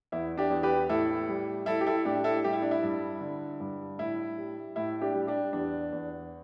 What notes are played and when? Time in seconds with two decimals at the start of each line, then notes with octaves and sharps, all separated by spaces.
0.12 E2 E4
0.38 D4 G4
0.50 E2
0.63 G4 B4
0.89 A2 E4 A4
1.28 G3
1.66 G3 E4 A4
1.81 G4
1.87 E4 A4
2.05 A2 D4 G4
2.24 E4 A4
2.44 G3 G4
2.53 E4
2.62 D4
2.71 E4
2.82 G2
3.21 D3
3.60 G2
3.98 A2 E4
4.38 G3
4.76 A2 E4
5.01 D4 G4
5.15 G3
5.27 D4 G4
5.53 E2 D4
5.92 E2